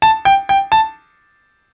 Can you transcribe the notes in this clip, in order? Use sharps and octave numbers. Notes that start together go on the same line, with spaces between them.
A5
G5
G5
A5